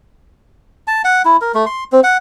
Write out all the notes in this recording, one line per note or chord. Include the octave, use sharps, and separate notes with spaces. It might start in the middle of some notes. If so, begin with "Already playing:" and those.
A5
F#5
E4
A#4
A3
C6
C4
F#5